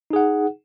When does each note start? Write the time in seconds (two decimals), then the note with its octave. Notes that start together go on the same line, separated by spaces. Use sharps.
0.10 D#4
0.13 G#4
0.16 F#5